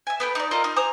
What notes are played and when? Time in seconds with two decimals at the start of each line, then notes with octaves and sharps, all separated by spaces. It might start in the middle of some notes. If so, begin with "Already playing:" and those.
0.07 E5 G#5
0.20 B3 A4 G5
0.35 D#4 D5
0.51 F4 A4 A#4 D#5
0.64 D#4
0.76 C5 G#5 A#5 D#6